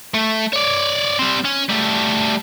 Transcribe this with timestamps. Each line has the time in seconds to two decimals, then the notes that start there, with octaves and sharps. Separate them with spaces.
0.14 A3
0.53 C#5 D5
1.19 G3 C4
1.45 C#4
1.69 G3 A3